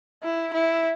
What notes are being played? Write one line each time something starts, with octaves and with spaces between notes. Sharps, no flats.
E4
E4